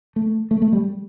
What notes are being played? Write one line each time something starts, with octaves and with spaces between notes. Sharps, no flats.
A3
A3
A3
G3